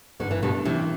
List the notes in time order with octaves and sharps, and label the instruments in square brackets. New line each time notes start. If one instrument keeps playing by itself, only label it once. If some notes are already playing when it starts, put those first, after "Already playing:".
[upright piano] G1 [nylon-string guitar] D3
[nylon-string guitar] E3
[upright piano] G2 [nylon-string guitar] B2 D3
[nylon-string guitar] C3 [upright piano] E3